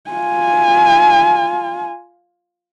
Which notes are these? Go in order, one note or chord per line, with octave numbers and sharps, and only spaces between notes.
F4 G#5